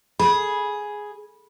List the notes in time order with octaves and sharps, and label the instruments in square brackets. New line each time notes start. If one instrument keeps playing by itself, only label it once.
[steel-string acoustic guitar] G#4 [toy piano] B5